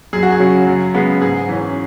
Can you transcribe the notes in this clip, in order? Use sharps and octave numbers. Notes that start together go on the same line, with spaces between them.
F#2 G#4
F#4
G#4
C#3 F#3 C#4
F#2
C#3 G#3 B3
G#2 G#4
E3 C#4